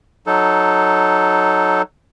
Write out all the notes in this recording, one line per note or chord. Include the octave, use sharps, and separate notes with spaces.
F#3 D#4 A4